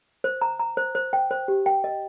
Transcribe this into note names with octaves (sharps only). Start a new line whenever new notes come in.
C5
A#5
A#5
C5
C5
G5
C5
G4
G5
D#5